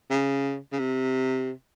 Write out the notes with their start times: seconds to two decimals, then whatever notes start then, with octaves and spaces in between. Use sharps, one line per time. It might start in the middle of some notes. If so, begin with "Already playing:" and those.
0.10 C#3
0.73 C#3
0.79 C3